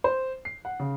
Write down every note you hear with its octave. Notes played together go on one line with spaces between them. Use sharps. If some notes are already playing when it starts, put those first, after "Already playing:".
C5
C7
F#5
C#3